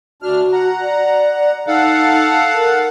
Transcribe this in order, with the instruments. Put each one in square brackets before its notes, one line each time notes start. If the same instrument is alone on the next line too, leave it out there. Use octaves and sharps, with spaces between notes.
[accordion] D2 D4 F6 [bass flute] F#4
[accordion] F#5 A#5
[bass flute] D5
[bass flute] D#4 [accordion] A4 F5 F#5
[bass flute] A#4